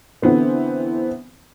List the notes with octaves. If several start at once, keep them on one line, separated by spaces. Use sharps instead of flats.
D3 E3 B3 C4